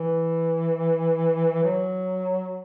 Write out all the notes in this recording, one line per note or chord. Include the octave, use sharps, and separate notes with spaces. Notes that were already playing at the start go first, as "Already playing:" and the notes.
Already playing: E3
F#3